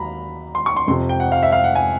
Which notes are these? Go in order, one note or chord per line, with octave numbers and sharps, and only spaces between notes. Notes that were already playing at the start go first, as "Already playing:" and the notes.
Already playing: D#2 D#3 F#3 A#5 B5
C6
C#6
C6
F2 C3 F3 C6
G5
F#5
F5
E5
F5
F#5
G#5